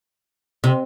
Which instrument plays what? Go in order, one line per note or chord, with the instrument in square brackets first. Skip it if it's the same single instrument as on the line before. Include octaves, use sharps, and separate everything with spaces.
[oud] C3